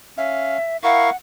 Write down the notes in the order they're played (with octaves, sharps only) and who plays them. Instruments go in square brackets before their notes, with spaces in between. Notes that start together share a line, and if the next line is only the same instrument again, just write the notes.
[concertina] C#4 F5 [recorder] E5
[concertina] E4 A#4 C#6 [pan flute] F5 [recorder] F#5